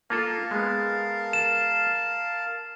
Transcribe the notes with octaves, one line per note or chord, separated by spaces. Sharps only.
A#3 F4 A4 A#4 F5 A5
G#3 B3
E7